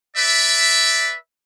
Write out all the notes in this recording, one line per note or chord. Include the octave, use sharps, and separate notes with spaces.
B4 D5 E5